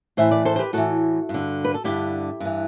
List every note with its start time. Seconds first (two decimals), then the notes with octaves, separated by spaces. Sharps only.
0.17 A2 E3 C5 E5
0.31 B4 D5
0.45 A4 C5
0.56 C5
0.59 G4 B4
0.73 A2 E3 F#4 A4
1.29 G2 D3
1.64 B4
1.74 A4
1.84 G2 D3 E4 G4
2.40 G2 E3